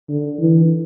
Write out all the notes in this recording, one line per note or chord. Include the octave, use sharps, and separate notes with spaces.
D3
E3